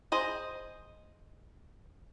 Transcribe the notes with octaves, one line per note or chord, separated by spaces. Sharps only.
G#4 C5 D#5